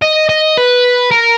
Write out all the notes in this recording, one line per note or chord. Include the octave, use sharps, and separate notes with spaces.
D#5
D#5
B4
A#4